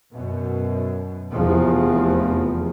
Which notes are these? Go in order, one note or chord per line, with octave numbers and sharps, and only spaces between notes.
F#2 B2
F1 E2 F3